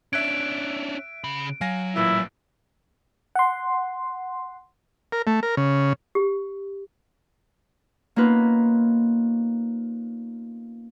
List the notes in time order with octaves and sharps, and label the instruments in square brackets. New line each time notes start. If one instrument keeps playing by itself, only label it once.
[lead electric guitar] C#4 D4 [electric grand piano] E5 F#6 G#6 [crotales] D7
[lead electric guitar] C#3 B5
[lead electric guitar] F#3 [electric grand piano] F5 G#5 A#6
[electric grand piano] A1 A#2 E3 [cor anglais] E4
[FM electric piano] F#5 C6
[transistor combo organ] A#4
A3
A#4
C#3
[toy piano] G4
[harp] A#3 B3 C#4 D#4 F4 B4